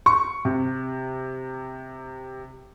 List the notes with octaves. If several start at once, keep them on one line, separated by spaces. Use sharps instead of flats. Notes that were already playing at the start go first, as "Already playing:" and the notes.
C#6
C3